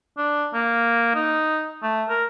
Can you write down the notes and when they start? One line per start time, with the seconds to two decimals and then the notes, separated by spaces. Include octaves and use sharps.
0.18 D4
0.53 A#3
1.15 D#4
1.82 A3
2.09 A#4